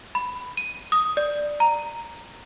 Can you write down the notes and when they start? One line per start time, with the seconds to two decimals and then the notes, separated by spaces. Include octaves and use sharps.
0.15 B5
0.57 D#7
0.92 D#6
1.17 D5
1.60 A#5